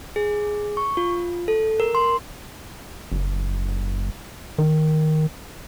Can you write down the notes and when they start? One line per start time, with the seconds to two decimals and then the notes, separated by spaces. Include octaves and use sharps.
0.16 G#4
0.77 C#6
0.97 F4
1.48 A4
1.80 A#4
1.95 C6
3.12 F#1
4.58 D#3